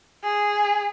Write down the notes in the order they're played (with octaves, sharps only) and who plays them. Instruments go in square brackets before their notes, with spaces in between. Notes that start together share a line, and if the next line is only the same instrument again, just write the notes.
[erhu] G#4